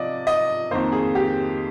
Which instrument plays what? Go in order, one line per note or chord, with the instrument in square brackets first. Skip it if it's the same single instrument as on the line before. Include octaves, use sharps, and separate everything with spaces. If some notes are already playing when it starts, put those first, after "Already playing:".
Already playing: [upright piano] C3 F3 D5 D#5
D#5
F2 D#3 A#3 C5
G#4
G4